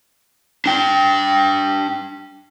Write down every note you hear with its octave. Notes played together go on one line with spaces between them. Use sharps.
D4 G5